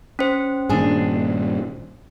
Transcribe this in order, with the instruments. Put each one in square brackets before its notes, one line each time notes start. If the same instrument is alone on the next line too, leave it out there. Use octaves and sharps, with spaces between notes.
[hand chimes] C#4 C5
[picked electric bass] G2 A#2 D#3 [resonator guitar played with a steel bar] D4 G#4